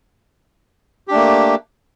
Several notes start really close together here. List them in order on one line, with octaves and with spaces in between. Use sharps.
G4 D4 A3 A#3